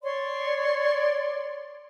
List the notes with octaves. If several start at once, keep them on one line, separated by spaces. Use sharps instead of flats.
C#5 D5 C6